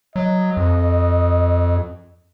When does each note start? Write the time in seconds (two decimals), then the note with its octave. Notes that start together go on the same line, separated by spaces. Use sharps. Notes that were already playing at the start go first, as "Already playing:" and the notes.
0.16 F#3 D#5
0.57 F2